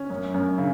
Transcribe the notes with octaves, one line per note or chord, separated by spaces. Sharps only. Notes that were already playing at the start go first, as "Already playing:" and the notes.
Already playing: C#4
F#2
F#2
C#3